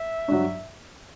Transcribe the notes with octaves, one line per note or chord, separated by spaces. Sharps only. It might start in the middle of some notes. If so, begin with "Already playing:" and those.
Already playing: E5
G2 F#3